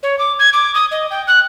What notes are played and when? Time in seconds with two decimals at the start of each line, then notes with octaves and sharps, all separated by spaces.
0.03 C#5
0.19 D6
0.39 G#6
0.53 D6
0.75 D#6
0.91 D#5
1.11 G5
1.28 F#6